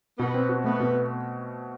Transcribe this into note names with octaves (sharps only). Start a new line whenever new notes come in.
B2 B3
C4
F#4
A3 B3
B2